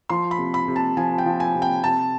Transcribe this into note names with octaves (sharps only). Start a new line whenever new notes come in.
F3 C6
B5
C3
B5
C3
A5
F3 G#5
G5
F3
G#5
C3
G5
C3 A5